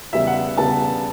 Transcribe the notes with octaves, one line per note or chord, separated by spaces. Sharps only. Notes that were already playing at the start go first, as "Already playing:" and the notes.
E2 C#3 G3 B3 E5
F#5
E2 C#3 G3 B3 A5